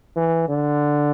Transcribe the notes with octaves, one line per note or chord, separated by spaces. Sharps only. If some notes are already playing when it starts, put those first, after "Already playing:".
E3
D3